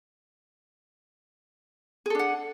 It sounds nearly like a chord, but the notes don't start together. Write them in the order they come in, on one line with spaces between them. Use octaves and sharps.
G#4 A4 D4 F#5